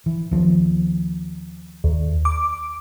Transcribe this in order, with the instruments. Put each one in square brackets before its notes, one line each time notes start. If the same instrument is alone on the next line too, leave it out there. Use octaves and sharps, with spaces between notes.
[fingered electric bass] E3
D#2 F3
[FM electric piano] D#2
D6